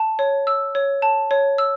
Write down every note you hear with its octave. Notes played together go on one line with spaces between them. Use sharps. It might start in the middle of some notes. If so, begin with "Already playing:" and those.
Already playing: A5
C#5
E6
C#5
A5
C#5
E6